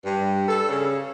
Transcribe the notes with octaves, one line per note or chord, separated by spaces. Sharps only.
G2
A4
C#3